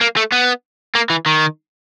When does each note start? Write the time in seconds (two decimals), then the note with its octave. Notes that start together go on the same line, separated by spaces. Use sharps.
0.01 A#3
0.17 A3
0.32 B3
0.95 A#3
1.10 E3
1.26 D#3